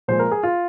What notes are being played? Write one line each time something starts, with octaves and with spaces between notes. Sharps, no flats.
A#2 F3 G#3 C5
A#4
G#4
F4